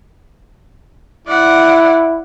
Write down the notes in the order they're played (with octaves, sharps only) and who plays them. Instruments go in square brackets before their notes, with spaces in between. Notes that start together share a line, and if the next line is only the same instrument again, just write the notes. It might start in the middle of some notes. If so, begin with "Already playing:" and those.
[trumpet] E4 [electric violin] D5 F#5